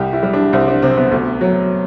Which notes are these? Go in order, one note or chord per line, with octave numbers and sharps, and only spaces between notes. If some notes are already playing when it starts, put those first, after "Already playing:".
Already playing: C2 G3 G4
E4
G3
D4
C2 C4
D4
C3 C4
B3
D2
F#3